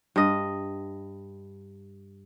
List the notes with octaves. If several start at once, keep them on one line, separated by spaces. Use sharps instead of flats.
G2 D#5